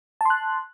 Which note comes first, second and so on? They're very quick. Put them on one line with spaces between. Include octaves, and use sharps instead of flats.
A5 C6 F#6